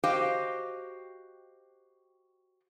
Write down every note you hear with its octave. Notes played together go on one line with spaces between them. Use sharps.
F#4 G4 C5 D#5 F5 G5